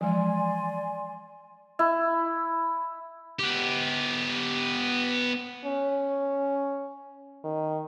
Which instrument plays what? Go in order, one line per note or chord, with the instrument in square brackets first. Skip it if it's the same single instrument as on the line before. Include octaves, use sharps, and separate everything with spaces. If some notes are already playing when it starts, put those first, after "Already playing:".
[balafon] E3 F3 G#3 [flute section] D5 G#5 C6
[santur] E4
[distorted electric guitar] B3 G4
[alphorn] C#4
D#3